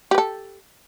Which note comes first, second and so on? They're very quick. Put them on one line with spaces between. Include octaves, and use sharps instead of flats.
G4 B4 A4